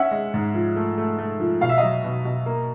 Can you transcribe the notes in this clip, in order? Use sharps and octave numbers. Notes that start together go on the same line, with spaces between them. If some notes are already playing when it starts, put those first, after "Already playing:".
Already playing: C#4 E5 F#5
G#3
G#2
F3
A3
A3
A3
F3
B2 F5
E5
F#3 D#5 F5
B2
B2
A#3